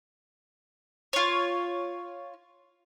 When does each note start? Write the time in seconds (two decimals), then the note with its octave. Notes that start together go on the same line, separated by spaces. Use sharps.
1.13 F4 C#5